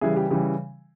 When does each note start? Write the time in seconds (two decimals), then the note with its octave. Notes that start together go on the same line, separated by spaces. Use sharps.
0.01 C#3 E3 G3 E4 G#4
0.16 G4
0.30 C#3 E3 G3 G4